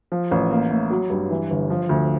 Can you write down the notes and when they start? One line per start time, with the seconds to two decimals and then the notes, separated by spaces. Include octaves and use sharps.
0.12 F3
0.31 A1
0.51 A#3
0.71 A2
0.91 F#3
1.10 G2
1.31 E3
1.50 G1
1.70 F3
1.89 D2